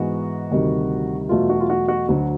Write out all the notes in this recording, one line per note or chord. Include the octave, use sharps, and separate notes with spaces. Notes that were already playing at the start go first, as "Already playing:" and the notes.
Already playing: G#2 E3 G#3 B3 F#4
D2 C3 D#3 G3
E2 B2 F#3 A3 F4
F#4
F4
F#4
F#4
D2 D3 F#3 F#4